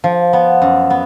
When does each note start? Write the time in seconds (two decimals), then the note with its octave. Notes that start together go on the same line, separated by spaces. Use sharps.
0.04 F3
0.33 B3
0.62 F#2
0.90 B3